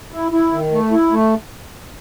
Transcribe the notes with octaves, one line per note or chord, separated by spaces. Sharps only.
E4
E4
D#3
A3
E4
A3